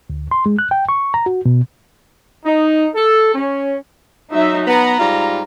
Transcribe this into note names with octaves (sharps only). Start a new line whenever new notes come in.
D2
C6
G#3
F#6
G5
C#6
A#5
F#4
B2
D#4
A4
C#4
F#3 D#4 E5
B3 A#5
G#2 G3 F4